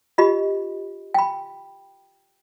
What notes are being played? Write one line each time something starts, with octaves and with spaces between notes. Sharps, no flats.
F4 G4 D#5 B5
G5 B5